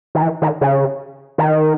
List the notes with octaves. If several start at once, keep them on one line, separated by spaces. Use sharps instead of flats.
D#3
E3
D#3
C#3
D#3